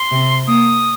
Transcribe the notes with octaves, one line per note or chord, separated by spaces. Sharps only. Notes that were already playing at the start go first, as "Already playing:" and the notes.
Already playing: C6
C3
A#3 D#6